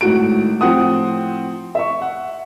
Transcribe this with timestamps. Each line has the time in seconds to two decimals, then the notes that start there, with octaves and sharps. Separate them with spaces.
0.01 G#1 A2 F#4 D7
0.61 A2 F3 C4 F#5 D#6
1.75 E5 C#6
2.02 F#5